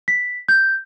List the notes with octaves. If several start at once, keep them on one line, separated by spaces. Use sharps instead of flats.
B6
G6